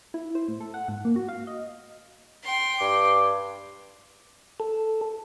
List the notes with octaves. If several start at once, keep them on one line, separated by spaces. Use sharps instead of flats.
E4
C5
A2
A4
F#5
G#2
A#3
F#4
F5
D#5
G5 C6
G2 D6
A4